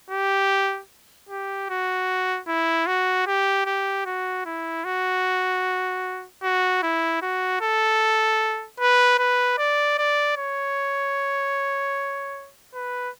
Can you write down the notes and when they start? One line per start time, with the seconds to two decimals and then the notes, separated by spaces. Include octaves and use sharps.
0.10 G4
1.29 G4
1.69 F#4
2.48 E4
2.87 F#4
3.26 G4
3.66 G4
4.05 F#4
4.45 E4
4.85 F#4
6.42 F#4
6.83 E4
7.22 F#4
7.61 A4
8.80 B4
9.18 B4
9.58 D5
9.98 D5
10.37 C#5
12.74 B4